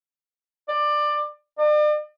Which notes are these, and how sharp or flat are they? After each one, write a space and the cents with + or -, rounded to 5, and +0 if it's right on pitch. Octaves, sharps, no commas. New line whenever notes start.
D5 +15
D5 +40